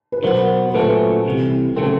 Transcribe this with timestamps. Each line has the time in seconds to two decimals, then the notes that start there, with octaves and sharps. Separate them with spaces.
0.12 B4
0.23 B2 F#3 B3 A#4 C5
0.70 C5
0.74 A#2 F#3 A3 C#4 A4 B4
1.25 C2 C3 E3
1.76 C#3 F#3 A3 C4 A4